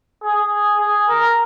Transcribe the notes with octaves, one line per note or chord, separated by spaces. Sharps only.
G#4
G#4
A#4